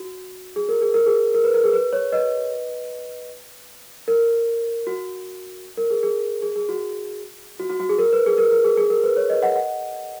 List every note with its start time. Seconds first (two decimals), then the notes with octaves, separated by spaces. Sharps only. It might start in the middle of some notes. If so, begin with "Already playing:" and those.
Already playing: F#4
0.56 G#4
0.69 A#4
0.82 G#4
0.94 A#4
1.06 G#4
1.34 A#4
1.44 B4
1.54 A#4
1.64 G#4
1.73 B4
1.93 C#5
2.12 B4 D#5
4.08 A#4
4.87 F#4
5.77 A#4
5.90 G#4
6.03 G#4
6.42 G#4
6.56 G#4
6.69 F#4
7.59 F#4
7.69 F#4
7.80 F#4
7.89 G#4
7.99 A#4
8.13 B4
8.26 G#4
8.38 A#4
8.51 A#4
8.64 G#4
8.78 G#4
8.90 A#4
9.04 B4
9.16 C#5
9.30 B4 D#5
9.42 D#5 F#5
9.56 D#5 F#5